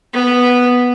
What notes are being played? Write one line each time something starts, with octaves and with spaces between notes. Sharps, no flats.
B3